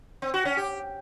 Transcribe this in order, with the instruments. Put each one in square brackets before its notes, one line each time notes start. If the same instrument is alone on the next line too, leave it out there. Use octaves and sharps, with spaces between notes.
[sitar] C4
F#4
C#4
G4